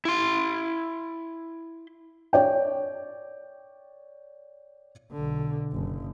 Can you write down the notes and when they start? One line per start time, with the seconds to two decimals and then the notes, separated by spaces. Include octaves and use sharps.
0.05 E4 C6
2.33 C#5 D5 G5
5.13 B1 D3
5.73 F#1